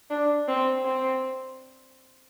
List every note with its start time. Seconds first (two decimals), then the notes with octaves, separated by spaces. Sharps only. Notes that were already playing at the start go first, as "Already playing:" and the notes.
0.10 D4
0.48 C4
0.85 C4